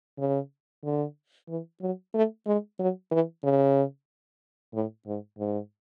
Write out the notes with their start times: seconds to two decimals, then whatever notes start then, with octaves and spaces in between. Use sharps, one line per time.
0.19 C#3
0.84 D3
1.49 E3
1.81 F#3
2.14 A3
2.46 G#3
2.79 F#3
3.11 E3
3.44 C#3
4.74 A2
5.07 G#2
5.39 G#2